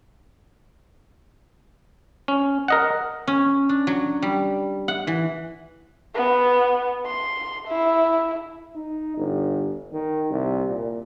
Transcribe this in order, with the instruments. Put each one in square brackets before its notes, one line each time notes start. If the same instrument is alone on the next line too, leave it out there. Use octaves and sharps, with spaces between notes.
[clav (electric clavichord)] C#4
A#4 D#5 F#5
[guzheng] C#4
D4
F#3
G3
F#5
E3
[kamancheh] B3
C6
E4
[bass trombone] D#4
G1
D#3
C2
A#2